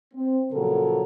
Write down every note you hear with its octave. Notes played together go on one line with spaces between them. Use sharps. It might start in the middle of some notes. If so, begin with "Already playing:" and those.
C4
A#2 C#3 F3 F#3 A4 A#4